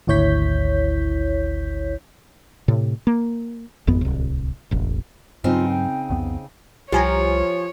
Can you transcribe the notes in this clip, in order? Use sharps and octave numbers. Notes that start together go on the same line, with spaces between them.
G#1 D2 E4 C#5 G6 B6
A2 C3
A#3
G#1 F2 B3
D1 C2
E1 A1
G2 C#3 F#3 C4 D#4 F4
G5
C2 F2 B3
C2 F3 G4 C#5 G#5 A#5